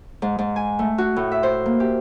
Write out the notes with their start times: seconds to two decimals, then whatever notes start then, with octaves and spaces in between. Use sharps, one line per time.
0.22 G#2
0.39 G#2
0.56 G#5
0.79 A3
0.98 F#4
1.16 A2
1.32 E5
1.43 C5
1.66 A#3
1.80 G4